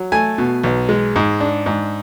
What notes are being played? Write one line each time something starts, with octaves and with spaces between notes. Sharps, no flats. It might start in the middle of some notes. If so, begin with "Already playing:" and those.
Already playing: F#3
A3 G#5
B2
B1
G#3
G#2
D4
G#2